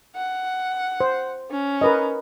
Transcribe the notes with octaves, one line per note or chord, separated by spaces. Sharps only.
F#5
C5
C#4
A#4 B4 D#5